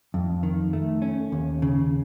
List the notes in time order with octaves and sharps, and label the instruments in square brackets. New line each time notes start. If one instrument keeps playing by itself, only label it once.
[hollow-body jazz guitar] F2
D#3
A3
C#4
D#2
C#3